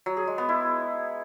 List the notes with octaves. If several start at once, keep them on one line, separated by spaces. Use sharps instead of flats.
F#3
G#4
G#3
B3
E4